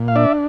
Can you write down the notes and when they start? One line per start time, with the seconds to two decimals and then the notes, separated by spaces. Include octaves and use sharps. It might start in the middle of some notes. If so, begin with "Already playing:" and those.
Already playing: A#2
0.08 F5
0.16 D4 D5 E5